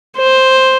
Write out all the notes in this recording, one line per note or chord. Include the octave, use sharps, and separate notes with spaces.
C5